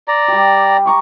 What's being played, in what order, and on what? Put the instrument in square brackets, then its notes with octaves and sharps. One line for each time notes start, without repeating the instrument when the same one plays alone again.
[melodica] D5 A#5
[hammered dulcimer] G3 G4
A#5 C#6 D6